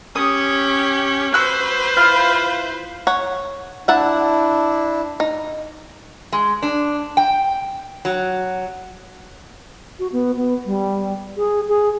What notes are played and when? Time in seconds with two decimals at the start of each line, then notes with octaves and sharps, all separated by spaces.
0.16 C#4 G4 D#6
1.34 F#4 B4 C5 E6 F#6
1.97 E4 F4 F5
3.07 C#5 F#5
3.88 D4 E4 E5 F#5 A5
5.20 D#4
6.32 G#3
6.62 D4
7.17 G5
8.05 F#3
9.99 F#4
10.12 B3
10.36 B3
10.66 G3
11.37 G#4
11.68 G#4